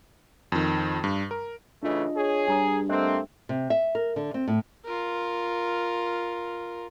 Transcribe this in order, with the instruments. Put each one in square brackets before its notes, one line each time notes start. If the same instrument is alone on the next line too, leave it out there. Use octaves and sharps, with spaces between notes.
[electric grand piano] F2 D#3
G2
A#4
[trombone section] C#3 E3 A3 [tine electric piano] D4 F4 D#5
[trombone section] G#4 [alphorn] C#5
[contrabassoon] G2 [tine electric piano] G#5 A#5 D#6
[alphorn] A3 [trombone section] A#3 C4 [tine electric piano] D#5 F#6
[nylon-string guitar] C3
E5
A#4
D3
C4
A2
[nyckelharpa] F4 A#4